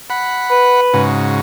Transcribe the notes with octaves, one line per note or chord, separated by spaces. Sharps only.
F#5 B5
B4
G#2 C#3 F#4